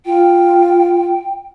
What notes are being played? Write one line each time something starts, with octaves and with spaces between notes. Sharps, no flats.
F4 G5